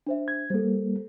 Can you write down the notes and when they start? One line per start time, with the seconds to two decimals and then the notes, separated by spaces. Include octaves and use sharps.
0.07 D4 C5 E5
0.28 G#6
0.50 G3 A#3 A4 C5